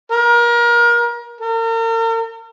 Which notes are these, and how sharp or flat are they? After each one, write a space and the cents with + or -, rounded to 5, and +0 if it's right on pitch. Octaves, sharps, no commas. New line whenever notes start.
A#4 +30
A#4 -40